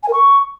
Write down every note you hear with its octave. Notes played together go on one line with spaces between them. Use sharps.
G#5
A#4
C#6